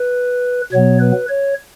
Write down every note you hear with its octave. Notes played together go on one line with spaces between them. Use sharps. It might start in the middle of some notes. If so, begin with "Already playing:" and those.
Already playing: B4
B2 F#3 B3 C#5
B4
C#5